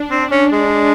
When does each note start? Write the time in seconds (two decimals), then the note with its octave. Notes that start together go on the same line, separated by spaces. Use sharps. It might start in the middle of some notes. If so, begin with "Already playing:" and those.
Already playing: D4
0.11 C4
0.31 C#4
0.52 G#3